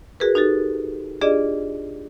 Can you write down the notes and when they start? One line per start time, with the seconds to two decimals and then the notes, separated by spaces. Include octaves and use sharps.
0.20 F#4 G#4 A#4 B4
0.35 D#4 F#4 G4 A4
1.21 D4 F4 G4 G#4 D5 D#5